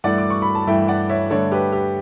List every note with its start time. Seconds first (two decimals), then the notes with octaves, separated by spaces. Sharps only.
0.04 G2 E3 A3 D5 F#5
0.18 D6
0.30 C#6
0.42 B5
0.55 A5
0.67 G2 E3 A3 E5 G5
0.88 D5 F#5
1.09 C#5 E5
1.30 G2 D3 A3 D4 A4 C#5
1.52 G4 B4
1.72 G4